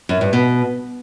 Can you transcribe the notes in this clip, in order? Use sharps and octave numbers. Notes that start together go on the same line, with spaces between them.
F#2
G2
B2